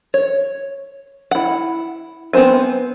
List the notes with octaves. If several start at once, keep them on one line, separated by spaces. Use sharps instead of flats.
C#5
E4 F#5
B3 C4 G#4 C5 G#5